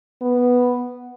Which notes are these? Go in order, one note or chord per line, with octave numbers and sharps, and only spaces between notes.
B3